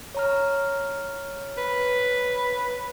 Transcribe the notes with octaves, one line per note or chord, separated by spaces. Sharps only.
C#5 A#5 F6
B4